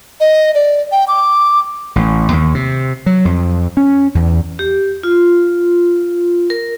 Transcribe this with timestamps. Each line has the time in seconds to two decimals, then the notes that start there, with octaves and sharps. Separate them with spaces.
0.20 D#5
0.55 D5
0.92 G5
1.08 D6
1.96 A1
2.33 D#2
2.54 C3
3.06 F#3
3.25 F2
3.77 C#4
4.15 E2
4.59 G4
5.03 F4
6.50 A#4